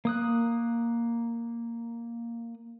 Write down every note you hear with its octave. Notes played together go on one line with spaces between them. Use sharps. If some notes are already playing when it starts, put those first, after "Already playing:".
A#3 D#6 F#6